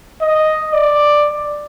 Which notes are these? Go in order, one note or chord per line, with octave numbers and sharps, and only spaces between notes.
D#5
D5